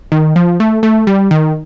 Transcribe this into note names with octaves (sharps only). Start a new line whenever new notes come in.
D#3
F3
A3
A3
G3
D#3